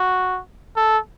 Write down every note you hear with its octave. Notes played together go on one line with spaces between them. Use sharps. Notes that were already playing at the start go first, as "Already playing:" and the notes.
Already playing: F#4
A4